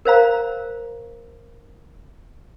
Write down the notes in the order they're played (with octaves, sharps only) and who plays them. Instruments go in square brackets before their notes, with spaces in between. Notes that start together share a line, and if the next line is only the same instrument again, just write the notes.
[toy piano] A#4 C5 F5 A#5